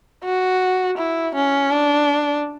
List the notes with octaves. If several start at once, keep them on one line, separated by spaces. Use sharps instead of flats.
F#4
E4
C#4
D4